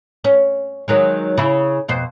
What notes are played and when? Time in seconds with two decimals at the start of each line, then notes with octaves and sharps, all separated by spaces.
0.24 C#4
0.88 D#3 F#3 G#3
1.38 C#3 E4
1.88 F2 B2 C5